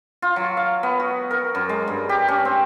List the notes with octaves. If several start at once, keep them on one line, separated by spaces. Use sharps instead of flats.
F4
F#3
F5
B3
F#4
A#4
F#2
G#3
G2
G4
C#4
C4